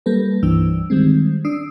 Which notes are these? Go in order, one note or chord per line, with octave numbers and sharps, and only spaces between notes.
G3 A#3 A4 B4
C2 G2 E3 D4 E6
D#3 G3 G#3 C4
D4 D#6 E6 C7